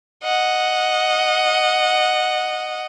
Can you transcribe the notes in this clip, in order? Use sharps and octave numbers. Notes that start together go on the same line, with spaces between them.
D#5 F#5